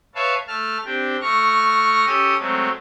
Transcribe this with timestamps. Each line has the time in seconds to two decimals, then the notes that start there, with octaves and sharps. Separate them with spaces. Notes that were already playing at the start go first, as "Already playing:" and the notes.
0.15 B4 C#5 E5 F5 A5
0.47 A3 A5 F6
0.85 C4 D4 G4
1.21 A3 C#6 F6 A#6
2.06 C#4 G4 A4 D#6
2.39 F#3 G#3 A3 C4